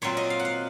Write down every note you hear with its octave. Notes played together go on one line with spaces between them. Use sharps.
A#2 F#3 C4 F4 C#5
D#5
F5
F#5
F5